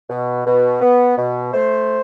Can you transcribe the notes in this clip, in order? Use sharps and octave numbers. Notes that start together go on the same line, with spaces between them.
B2
B2
B3
B2
A3 C5